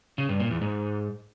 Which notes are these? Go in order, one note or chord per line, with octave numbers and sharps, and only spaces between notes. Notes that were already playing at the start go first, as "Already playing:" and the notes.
C#3
G2
A#2
E2
G#2